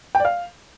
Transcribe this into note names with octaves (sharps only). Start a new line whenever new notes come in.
G5
D5
F5